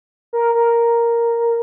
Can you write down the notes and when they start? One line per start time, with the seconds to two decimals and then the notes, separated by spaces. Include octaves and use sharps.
0.33 A#4
0.55 A#4